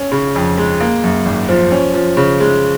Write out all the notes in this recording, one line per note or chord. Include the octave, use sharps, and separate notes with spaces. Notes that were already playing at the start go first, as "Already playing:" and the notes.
Already playing: C#4
C#3
F2
G#3
A#3
F#2
G#1
F3
C#4
F3
C#3
G#3